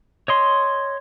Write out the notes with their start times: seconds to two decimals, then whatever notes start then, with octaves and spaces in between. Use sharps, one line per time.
0.28 C#5 D#5 C6